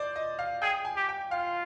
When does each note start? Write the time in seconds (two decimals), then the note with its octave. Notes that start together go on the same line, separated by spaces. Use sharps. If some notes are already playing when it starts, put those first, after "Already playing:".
Already playing: C5 D5
0.16 D#5
0.39 F5
0.62 G#4 G5
0.85 G#5
0.97 G4
1.09 G5
1.31 F4 F5